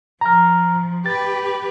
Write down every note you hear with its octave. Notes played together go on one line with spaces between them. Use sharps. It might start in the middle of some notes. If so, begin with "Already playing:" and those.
F3 A#5 F6
G4 B4 A6